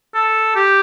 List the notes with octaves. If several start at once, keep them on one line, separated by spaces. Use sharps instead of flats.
A4
G4